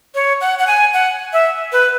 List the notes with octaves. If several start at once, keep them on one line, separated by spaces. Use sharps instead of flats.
C#5
F#5
F#5
G#5
F#5
E5
B4